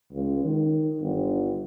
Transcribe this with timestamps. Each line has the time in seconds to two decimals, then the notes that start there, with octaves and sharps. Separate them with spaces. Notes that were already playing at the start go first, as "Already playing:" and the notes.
0.12 C#2
0.44 D#3
1.01 G1